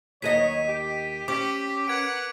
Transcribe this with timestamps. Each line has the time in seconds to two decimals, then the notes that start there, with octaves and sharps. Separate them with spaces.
0.22 D#2 D#3 F#3 G#4 C#5 D#5 B6 D#7
0.68 G4
1.28 C#4 G4 D6
1.88 A#4 B4 F#5 G#6 D7